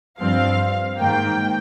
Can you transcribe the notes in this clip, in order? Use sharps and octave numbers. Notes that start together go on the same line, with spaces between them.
G2 F3 C4 F5
G#2 D#3 A#3 G5